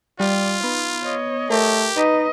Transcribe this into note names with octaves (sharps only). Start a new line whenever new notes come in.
G3 F4 D5
B3 D#4
C#5 D#5
A3 G4 A#4
D#4 B4 D#5